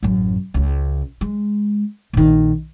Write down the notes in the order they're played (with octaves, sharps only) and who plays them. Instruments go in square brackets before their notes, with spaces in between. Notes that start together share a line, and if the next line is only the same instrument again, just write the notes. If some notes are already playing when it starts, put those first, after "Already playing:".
[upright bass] A1 F#2
C#2 C#3
G#3
A#1 D#3